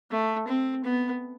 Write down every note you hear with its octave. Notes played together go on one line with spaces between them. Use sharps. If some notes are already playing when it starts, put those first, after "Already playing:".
A3
C4
B3